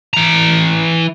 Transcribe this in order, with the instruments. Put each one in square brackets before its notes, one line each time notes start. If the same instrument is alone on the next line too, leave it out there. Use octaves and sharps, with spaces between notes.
[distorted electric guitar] E3 A#5